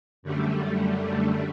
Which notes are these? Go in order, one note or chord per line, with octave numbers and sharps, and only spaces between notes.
F#2 D3 G3 A3